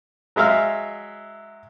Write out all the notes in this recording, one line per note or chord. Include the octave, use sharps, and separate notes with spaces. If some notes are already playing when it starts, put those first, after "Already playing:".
F#3 G#3 E5 F5 F6